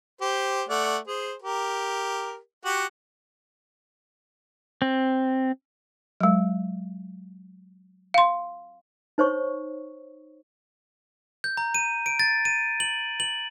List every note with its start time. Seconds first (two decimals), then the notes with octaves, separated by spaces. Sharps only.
0.21 G4 C5
0.69 A3 D5 F#5
1.07 G#4 C5
1.42 G4 A#4
2.65 F#4 G4 F#5
4.82 C4
6.20 F#3 G#3
8.14 F5 C6
9.18 D#4 C5 C#5 C#6
11.44 G6
11.57 A#5
11.75 D#7
12.06 D7
12.19 A6
12.45 D#7
12.80 F#7
13.20 F#7